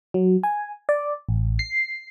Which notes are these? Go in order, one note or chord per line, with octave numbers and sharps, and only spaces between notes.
F#3
G#5
D5
A1
C7